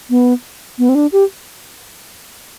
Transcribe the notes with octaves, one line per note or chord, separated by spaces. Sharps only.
B3
B3
C4
D4
G4